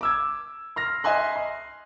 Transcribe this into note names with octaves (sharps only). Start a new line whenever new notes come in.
D6 E6 G#6
C6 F6 A#6
D#5 E5 G#5 C6 F#6
C6